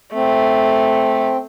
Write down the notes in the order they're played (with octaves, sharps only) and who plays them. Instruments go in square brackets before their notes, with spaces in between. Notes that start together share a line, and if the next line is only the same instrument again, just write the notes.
[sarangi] A3 [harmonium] C4